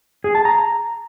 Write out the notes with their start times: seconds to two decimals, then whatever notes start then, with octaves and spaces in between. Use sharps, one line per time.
0.24 G#4
0.35 A5
0.45 A#5